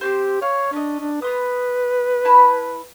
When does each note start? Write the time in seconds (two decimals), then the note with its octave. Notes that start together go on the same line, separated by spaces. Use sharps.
0.01 C4 C#4 G4 C5
0.42 C#5 F5
0.73 C#4 D4 D#5
1.00 D4
1.22 B3 B4 C6 D#6
2.25 E4 A5 B5